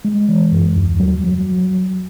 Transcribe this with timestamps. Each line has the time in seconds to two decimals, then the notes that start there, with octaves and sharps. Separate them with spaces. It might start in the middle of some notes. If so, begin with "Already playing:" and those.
0.05 G#3
0.29 E3
0.52 F#2
0.76 D#2
1.00 F#3
1.24 F#3